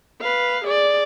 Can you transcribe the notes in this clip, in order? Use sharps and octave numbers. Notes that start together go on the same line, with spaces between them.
B4 F5
G#4 D5